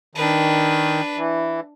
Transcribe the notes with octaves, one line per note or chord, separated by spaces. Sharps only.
D#3 D4 B4
E3